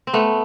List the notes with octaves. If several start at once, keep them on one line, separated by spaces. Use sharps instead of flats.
C4
A3 B3